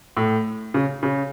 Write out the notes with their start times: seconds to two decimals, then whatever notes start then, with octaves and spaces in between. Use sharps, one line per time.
0.17 A2
0.74 C#3
1.03 C#3